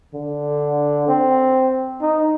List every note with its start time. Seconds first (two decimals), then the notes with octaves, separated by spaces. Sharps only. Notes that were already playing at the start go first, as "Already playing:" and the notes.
0.14 D3
1.08 C4
2.02 D#4